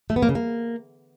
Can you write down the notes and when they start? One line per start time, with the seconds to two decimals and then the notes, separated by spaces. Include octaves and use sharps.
0.10 A3
0.16 B3
0.23 A#3
0.29 C#3
0.35 A#3